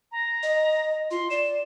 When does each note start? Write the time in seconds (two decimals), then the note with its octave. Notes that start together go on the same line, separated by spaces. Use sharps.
0.12 A#5
0.43 D#5
1.11 F4 C6
1.30 D5 E7